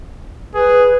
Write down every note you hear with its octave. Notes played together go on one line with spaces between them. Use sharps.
G#4 B4